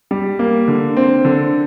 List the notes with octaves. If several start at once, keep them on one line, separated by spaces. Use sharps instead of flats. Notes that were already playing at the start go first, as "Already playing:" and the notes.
G3
A#3
D3
C4
D3